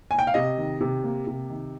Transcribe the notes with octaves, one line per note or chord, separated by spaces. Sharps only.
G#5
G5
F5
C3 D#5
D#3
C3
A#3
C3
D#3